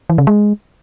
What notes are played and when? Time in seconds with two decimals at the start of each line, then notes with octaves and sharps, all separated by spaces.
0.09 E3
0.18 C#3
0.27 G#3